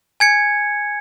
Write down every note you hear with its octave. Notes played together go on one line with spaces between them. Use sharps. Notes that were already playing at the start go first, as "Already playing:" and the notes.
G#5 G#6 C#7